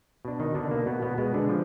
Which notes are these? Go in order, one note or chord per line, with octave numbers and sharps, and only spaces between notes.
B2 D4
D#3 D#4
B2 D3 D4
A#3
B2 B3
B2 B3
B2 G#3 B3
D3 D4
F3